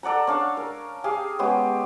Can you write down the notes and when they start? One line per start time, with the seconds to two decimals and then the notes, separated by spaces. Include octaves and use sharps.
0.03 A4 D5 F#5 A#5
0.27 C#4 D4 F5
0.57 A#4
1.04 G4 G#4 F5
1.39 G#3 B3 C#4 G4